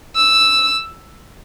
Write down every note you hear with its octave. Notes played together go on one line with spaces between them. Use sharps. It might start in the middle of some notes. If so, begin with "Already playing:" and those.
E6